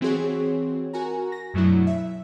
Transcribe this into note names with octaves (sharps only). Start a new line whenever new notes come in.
E3 C4 F#4 G#4 C#5
F#4 A#4 G#5 A#5
A#6
F#2 B2 F#3 A3 D4 E4
E5